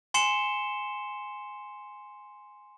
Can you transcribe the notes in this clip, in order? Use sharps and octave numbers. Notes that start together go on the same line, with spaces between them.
G#5 C6 C7 C#7 E7 G7